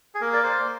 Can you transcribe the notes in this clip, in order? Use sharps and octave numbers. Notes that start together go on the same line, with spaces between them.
G#4
A#3 A#4
D5
C5